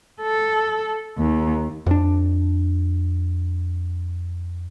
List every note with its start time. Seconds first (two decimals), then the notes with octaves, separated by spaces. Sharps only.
0.22 A4
1.18 D#2
1.86 F2 D4